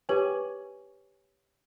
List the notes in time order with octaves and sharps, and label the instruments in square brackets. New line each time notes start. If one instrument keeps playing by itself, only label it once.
[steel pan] G4 C#5 G#5 [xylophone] B4